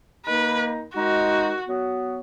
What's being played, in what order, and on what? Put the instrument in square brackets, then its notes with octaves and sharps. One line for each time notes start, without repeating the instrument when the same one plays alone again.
[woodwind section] D#3 A#3 D#4 [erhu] B4
[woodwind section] D#3 G#3 D#4 [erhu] F#4
[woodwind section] F#3 B3 F#4